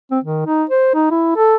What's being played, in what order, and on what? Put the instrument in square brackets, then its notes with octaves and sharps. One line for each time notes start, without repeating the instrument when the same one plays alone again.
[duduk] C4
D#3
D#4
C5
D#4
E4
A4